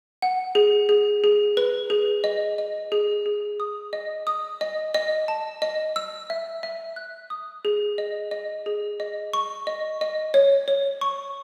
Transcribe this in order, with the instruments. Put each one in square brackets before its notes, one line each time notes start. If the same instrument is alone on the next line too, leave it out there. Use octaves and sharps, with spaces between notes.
[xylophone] F#5
G#4
G#4
G#4
B4
G#4
D#5
D#5
G#4
G#4
D#6
D#5
D#6
D#5
D#5
A5
D#5
E6
E5
E5
F#6
D#6
G#4
D#5
D#5
G#4
D#5
C#6
D#5
D#5
C#5
C#5
C#6